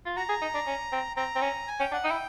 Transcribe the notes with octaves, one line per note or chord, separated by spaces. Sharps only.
F4
F#4 A#5
G#4
D#4
D4
C#4
C4
C4 A#5
C4
C#4
G#5
C#4 G5
D4 F#5
D#4 G5
E4